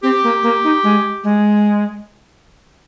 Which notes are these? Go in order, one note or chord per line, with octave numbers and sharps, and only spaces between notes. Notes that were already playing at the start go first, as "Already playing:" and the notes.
C4 G4
A#3
A#3
D#4
G#3
G#3